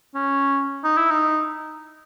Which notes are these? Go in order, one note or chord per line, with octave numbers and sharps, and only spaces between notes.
C#4
D#4
E4
D#4